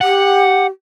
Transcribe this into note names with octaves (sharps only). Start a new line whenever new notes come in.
G4 F#5